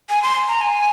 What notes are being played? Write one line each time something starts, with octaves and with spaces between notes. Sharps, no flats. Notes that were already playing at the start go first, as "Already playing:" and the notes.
G#5
C6
A#5
G#5